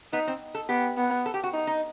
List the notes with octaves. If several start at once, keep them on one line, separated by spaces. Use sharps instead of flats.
B3 D#4
C4
A4
B3 G4
B3
A4
G4
F#4
D#4
D#4